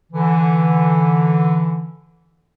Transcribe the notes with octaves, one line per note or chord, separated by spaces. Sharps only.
D3 E3